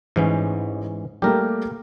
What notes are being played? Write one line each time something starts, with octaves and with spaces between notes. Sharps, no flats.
A1 G#2 E3 C#4
G3 A3 A#3 G4 A#4